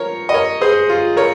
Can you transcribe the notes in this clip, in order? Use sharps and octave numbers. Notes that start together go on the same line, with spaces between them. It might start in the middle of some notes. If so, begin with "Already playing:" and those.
Already playing: F3 A#4 C#5
D#5
A#4 C#5
G#4 C5
F4
A#4 C#5